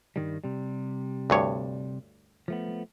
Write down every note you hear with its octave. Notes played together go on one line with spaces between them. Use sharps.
G2 D#3 G3
C3 G3
D2 G2 C#5
F3 A3 B3